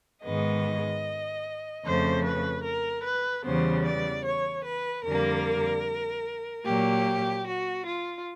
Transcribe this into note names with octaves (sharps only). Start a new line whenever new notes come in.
G#2 D#3 G#3 B3 D#5
F2 C#3 F3 A3 C5
B4
A#4
B4
E2 C#3 E3 G3 B3 C5
D5
C#5
B4
F2 D3 G3 A#3 A#4
A#2 F#3 A#3 G4
F#4
F4